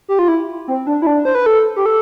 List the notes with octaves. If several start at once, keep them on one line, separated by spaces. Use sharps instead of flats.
G4
F4
E4
C4
D4
E4
D4
C5
B4
A4
G4
A4